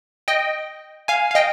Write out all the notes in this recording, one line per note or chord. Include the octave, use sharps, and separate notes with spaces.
D#5 G5
F5 G#5
F5
D#5 G5